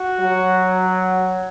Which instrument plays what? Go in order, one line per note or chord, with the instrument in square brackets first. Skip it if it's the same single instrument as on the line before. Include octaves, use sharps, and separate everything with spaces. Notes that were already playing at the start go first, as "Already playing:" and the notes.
Already playing: [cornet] F#4
[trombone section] F#3